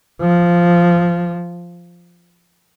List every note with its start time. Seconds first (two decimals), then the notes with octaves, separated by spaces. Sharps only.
0.21 F3